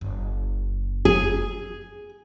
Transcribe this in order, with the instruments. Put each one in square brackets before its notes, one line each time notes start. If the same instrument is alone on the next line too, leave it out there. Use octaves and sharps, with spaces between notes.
[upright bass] F#1
[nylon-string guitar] G#4